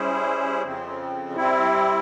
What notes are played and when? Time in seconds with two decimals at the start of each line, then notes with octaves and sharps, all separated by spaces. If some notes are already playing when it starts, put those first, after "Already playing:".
Already playing: G3 C#4 E4 G#4 C5
0.63 F2 C#3 F3 C4
1.36 G3 C4 E4